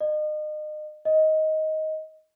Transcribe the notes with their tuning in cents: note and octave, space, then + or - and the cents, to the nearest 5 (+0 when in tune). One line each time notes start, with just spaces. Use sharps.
D#5 -35
D#5 +10